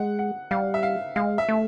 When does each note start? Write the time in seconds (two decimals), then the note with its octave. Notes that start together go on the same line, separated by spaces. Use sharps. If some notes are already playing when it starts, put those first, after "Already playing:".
Already playing: G#3 F#5
0.19 F#5
0.51 G3 F5
0.74 E5
0.83 F5
1.16 G#3 F5
1.38 E5
1.49 A3